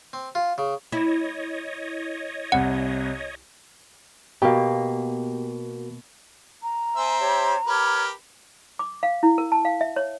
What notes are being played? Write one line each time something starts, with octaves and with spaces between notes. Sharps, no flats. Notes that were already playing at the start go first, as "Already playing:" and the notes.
C4
F4
C#3
E4 C#5 D#5
C2 C3 F#5
B2 A#3 B3 F#4 G4 A#4
A#5
C4 C5 E5 G#5
G4 C#5
G4 A#4 B4 C#5 F6
D6
F5
E4
A#4
A5
F5
E5
C#5